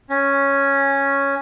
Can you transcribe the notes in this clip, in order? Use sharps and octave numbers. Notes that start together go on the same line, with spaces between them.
C#4